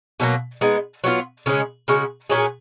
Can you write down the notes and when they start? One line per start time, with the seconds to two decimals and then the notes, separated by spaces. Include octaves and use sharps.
0.20 B2 F#3 A#3
0.61 G#3 B3 D#4
1.04 F#3 B3 F4
1.46 C#3 G#3 C#4
1.88 C#3 G#3 C#4 F#4
2.30 A#2 F#3 C#4 G#4